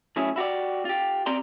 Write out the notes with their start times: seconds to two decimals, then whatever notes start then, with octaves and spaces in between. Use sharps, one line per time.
0.16 A2 F#3 C#4 E4 G#4
0.36 E4 F#4 G4 D5
0.85 F4 G4
1.26 C4 G4 D5 A#5 C6